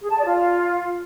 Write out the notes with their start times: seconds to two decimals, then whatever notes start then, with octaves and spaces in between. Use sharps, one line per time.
0.01 G#4
0.10 A5
0.18 D5
0.27 F4